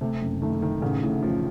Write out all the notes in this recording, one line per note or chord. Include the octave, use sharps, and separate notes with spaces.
C3 A3
F#1
D#3 A3
D#3 A3
A1 C#3
A2
A1 F3